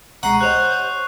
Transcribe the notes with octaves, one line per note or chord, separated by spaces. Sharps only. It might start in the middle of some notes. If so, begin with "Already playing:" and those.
C2 B2 G#3 F#5 A#5 C#6 C7
G4 C5 C#5 D#5 F#6 F7